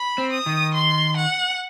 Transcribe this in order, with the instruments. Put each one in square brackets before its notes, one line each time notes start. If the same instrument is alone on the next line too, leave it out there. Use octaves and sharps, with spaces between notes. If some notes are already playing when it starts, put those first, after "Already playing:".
Already playing: [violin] B5
[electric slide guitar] C4
[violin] D#6
[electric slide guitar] D#3
[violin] C6
F#5